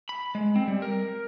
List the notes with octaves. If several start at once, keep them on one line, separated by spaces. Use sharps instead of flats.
B5
G#3
C4
G3
A#4